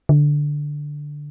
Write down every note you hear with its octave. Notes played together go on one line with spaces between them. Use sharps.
D3